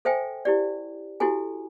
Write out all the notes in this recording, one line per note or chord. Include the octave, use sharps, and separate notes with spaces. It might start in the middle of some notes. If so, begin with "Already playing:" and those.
A4 C5 E5 G5 G#5
E4 G4 D5
E4 F#4 G4 A4 G#5